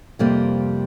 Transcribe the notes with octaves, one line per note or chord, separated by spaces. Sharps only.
F2 C3 G3 A#3